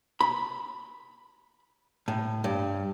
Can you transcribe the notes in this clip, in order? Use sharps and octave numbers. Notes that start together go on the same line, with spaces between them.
B5
A2
G2